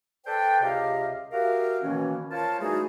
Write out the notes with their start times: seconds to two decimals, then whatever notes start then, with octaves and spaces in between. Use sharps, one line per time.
0.26 A4 B4 C5 D5 G5
0.62 C#2 C3 G4 D#5 F5
1.32 F#4 G4 A#4 E5 F5
1.82 B2 D#3 E3 A#3 C#4
2.31 F4 A#4 C5 C#5 A5
2.59 E3 G3 A3 D#4 F#4 G#4